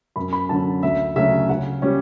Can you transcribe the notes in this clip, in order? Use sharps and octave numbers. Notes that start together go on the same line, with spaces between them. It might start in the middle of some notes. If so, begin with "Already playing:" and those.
F#2 B5
B5
D3 F#3 C#4 A5
D2 E5
C#3 F#3 A3 D4 E5
C#3 F#5
G3 C#4